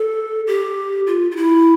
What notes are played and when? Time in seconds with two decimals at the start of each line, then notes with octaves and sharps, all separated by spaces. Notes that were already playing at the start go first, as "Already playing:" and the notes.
Already playing: A4
0.47 G4
1.07 F4
1.31 F4
1.36 E4